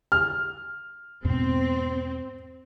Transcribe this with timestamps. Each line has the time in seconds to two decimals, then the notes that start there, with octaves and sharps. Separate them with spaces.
0.12 F6
1.24 E2 G#2 B2 C4